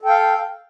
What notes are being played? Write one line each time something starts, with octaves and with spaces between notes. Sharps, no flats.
A4 F5 G5